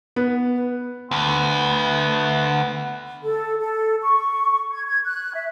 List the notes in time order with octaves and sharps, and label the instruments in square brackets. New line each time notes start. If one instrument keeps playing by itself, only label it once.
[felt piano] B3
[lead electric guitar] D2 [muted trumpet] B3
[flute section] A4
A4
C#6
G#6
G#6
F#6
E5